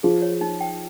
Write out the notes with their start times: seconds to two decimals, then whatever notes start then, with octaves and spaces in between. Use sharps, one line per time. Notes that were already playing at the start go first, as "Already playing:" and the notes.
0.03 F3 G#4
0.22 C#5
0.41 D#4
0.61 G5